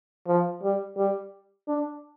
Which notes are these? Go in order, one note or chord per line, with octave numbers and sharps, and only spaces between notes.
F3
G3
G3
D4